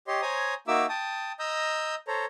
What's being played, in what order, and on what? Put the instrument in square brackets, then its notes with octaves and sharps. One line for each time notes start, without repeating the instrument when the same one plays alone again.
[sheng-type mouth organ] G4 C#5 D#5 C6
C5 C#5 G#5 A#5 D#6
A#3 D#4 F#4 E5 D6 E6
G5 A5 D#6
D#5 A#5 D#6 E6 G6
A4 C5 C#5 A#5